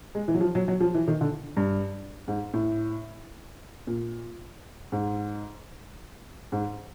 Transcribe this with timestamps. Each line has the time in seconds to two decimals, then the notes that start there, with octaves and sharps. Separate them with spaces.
0.15 G#3
0.28 E3
0.35 F#3
0.41 F3
0.55 F#3
0.68 F#3
0.81 F3
0.94 E3
1.08 D#3
1.21 D3
1.57 G2
2.28 G#2
2.53 A2
3.87 A#2
4.92 G#2
6.52 G#2